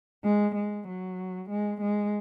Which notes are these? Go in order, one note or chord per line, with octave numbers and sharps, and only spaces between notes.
G#3
G#3
F#3
G#3
G#3